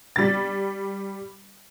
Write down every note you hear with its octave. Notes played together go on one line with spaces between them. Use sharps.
G3 A6